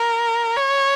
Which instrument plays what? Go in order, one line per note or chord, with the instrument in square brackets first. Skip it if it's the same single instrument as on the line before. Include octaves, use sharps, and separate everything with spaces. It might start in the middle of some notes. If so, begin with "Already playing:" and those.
Already playing: [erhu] A#4
C#5